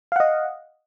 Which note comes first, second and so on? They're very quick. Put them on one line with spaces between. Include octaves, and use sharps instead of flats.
F5 F#5 D#5